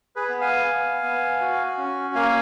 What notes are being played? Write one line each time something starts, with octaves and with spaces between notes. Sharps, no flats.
G#4 B4
B3
F5 G#5
B3
B3
F#4
C#4
A#3 F5 G#5